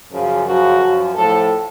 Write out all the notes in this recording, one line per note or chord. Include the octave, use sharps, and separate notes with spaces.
F#2 C#3 F3
F#2 C#3 F3 F#4
F#2 F3
A2 F3 A4